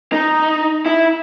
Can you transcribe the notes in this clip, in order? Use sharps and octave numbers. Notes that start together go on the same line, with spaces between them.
D#4
E4